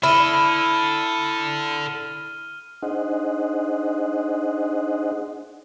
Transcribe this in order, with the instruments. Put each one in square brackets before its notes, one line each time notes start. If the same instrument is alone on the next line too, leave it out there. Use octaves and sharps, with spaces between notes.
[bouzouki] E4 [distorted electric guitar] A4 D5 [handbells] B5 [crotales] F6 D#7 G7
[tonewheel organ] D4 D#4 G#4 C5 D#5 F#5